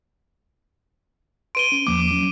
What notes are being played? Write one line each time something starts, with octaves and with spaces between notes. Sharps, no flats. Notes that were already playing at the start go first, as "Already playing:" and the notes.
B4 C6 D7 D#7 G7
C#4
E2 F3 A#3 D6
F#3 C#4